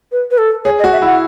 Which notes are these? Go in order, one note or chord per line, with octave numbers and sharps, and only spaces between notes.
B4
B4
A4
G#4 C#5
D#5
F#4
E5
E4 F#5